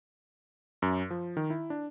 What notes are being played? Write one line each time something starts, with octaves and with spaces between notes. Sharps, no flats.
F#2
F3
D#3
E4
D4